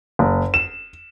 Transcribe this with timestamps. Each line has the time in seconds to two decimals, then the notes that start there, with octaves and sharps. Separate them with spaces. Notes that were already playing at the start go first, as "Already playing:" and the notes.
0.19 F#1
0.54 E7